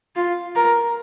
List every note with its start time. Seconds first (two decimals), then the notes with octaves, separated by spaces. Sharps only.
0.16 F4
0.55 A#4